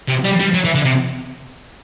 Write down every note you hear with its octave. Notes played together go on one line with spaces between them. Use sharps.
C3
G3
G3
F#3
E3
D3
C3